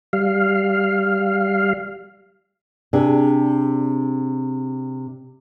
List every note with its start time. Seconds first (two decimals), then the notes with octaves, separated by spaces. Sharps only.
0.13 G3 F5
2.93 C3 D4 G#4